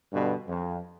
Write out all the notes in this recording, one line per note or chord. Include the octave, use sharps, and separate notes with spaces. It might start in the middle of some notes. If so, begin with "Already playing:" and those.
G2 B2 D3
F2